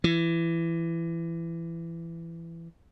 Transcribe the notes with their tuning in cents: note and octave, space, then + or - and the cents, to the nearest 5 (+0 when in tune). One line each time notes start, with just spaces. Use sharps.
E3 +20